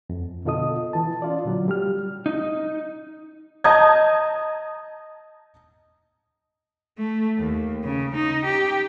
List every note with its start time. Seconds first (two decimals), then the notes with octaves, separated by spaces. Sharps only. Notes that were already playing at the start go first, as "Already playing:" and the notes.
0.10 F2
0.45 B2 D3 F4 A4 D#5 D#6
0.93 E3 A5
1.22 C#4 F4 D5
1.45 A#2 D3 F#3
1.68 G3 G4 F6
2.26 D#4
3.64 D#5 A5 A#5 D#6 G6 G#6
6.98 A3
7.38 D#2
7.84 C#3
8.15 D#4
8.45 G4